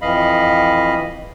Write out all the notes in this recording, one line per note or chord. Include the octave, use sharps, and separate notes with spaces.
F2 E3 D#5 F5 B5